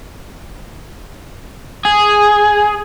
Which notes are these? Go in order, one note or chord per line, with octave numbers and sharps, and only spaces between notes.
G#4